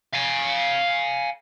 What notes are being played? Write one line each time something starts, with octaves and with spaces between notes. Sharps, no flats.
F5 G#5